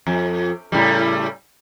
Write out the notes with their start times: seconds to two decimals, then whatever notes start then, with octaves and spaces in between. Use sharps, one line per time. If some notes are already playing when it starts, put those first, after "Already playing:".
0.07 F2
0.72 A2 C#3 G3